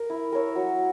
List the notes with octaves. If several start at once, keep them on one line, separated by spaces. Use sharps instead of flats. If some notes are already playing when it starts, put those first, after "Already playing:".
Already playing: A#4
E4
A#4 C#5 E5
F#3